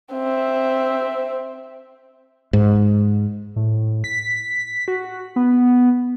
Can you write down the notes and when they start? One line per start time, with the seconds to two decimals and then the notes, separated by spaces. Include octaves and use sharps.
0.13 C4 E5
2.53 G#2
3.56 A2
4.04 B6
4.88 F#4
5.36 B3